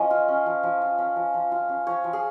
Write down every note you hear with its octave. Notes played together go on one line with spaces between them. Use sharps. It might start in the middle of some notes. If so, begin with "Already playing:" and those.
Already playing: F3 C#4 D#5 G#5
F4
C#4
F3
F3
F4
C#4
F3
F3
F4
C#4
F3 C#5
F3
G#4